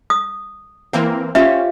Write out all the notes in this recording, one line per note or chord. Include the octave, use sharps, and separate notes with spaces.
D#6
E3 A#3 C4 A#4
C#4 F4 G4 C5 E5